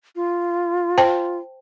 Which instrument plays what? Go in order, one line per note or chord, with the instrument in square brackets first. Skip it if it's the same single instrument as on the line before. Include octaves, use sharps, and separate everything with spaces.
[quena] F4
[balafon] C5 G5 A5